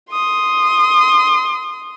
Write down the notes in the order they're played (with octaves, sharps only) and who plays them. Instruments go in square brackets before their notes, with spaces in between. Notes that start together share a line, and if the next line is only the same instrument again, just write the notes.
[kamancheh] C6 D#6